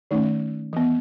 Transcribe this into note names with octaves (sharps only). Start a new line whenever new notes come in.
D#3 A3 C#4 D#4
E3 B3